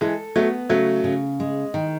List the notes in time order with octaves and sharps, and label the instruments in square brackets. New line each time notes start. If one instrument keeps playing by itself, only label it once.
[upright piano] E3 G#3 [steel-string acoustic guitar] A4
[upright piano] F#3 A3 [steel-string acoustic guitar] B3
[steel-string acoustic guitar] C#3 [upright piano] F#3 A3
[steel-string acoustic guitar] C#3
G#3
D#3